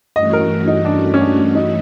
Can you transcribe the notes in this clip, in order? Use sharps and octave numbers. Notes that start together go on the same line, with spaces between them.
G2 E3 A3 C#4 F#4 D#5
A#4
D#4
D4
C#4
D4
D#4